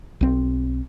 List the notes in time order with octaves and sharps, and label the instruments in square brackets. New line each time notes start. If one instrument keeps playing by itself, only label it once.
[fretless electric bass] B1 C4